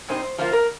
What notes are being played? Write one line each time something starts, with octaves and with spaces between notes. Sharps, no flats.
A#2 G3 C4 D#4 C5
F3 A#3 F4 C5
A#4